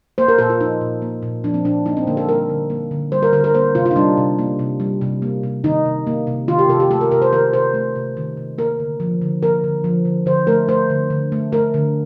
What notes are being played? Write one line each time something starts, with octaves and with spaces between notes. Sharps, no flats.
A#3 C5
A#4
A#2 A4
F4
F3 D#4
A#2
A#3
A#2
F3 D4
C4
A#2 D4
A#3 D#4
C4
D3 A#3
A4
G3 A#4
D3
A#3
D3
G3 C5
A#4
D3 A#4
A#4
A#3 C5
C3 F4
F4
D#4
G3 D4
C3
A#3
C3
G3
C3
A#3
C3
D#3 D#4
C3
A#3
C3
D#3 F4
G4
C3 A4
G4
A3 A4
A#4
C3 A#4
C5
D#3 A#4
C3 C5
A3
C3
D#3
C3
A#3 A#4
D3
F3
D3
A#3 A#4
D3
F3
D3
D3 C5
A3 A#4
A3 C5
D3
D3
A3
A3 A#4
D3